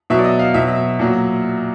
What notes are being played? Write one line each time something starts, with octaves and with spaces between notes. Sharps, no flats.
B2 F#3 E5
D5
D#5
F5
B2 F#3 E5
A#2 F#3